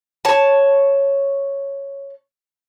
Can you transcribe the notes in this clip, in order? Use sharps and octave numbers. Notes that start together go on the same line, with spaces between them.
C#5 A5